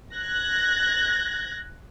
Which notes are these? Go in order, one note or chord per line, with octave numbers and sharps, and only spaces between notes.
F#6 G#6 A#6